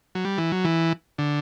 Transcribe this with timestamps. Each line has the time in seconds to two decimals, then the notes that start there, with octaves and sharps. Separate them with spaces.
0.15 F#3
0.25 G3
0.38 E3
0.52 F#3
0.65 E3
1.18 D3